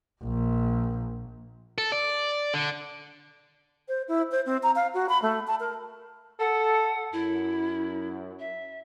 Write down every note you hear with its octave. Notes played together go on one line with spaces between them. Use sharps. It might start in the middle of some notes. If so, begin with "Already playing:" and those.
A#1
A4
D5
D3
C5
E4
C5
C4
A#5
F5
F#4
B5
A3
A5
A#4
A4 F#5
F#2 E4
E5